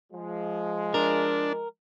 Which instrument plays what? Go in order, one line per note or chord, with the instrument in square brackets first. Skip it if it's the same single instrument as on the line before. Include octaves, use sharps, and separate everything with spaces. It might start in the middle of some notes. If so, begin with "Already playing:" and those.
[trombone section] F3 G#3
[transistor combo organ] D4 [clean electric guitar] A#4